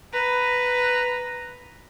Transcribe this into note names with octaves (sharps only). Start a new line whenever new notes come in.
B4 A#5